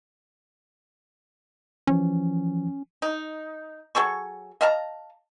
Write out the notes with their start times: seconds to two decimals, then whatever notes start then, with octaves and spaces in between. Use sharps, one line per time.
1.87 E3 F3 C#4
3.02 D#4
3.95 F#3 G#4 A4 C#6
4.61 D#5 F5 A5 A#5